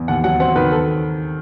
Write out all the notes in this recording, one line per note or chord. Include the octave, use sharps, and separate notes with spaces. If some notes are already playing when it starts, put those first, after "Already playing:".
Already playing: E2
D#2 F#5
F#3 F#5
C4 F#5
D#3 B4
A4